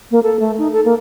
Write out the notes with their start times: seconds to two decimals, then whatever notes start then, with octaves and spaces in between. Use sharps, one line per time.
0.11 A#3
0.23 A4
0.40 A3
0.58 D#4
0.73 A4
0.85 A#3